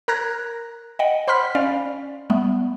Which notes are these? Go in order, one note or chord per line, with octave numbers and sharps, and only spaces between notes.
A#4 A#5 F#6 G#6 A#6
D#5 F#5 G5
C5 B5 C6 F6 B6
C#4 D5 F5
G3 A3 B3